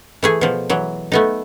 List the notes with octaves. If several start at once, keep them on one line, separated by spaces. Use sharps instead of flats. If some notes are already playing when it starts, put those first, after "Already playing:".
E3 A3 G#4
B2 F3
E3 F#3
A3 B3 D#4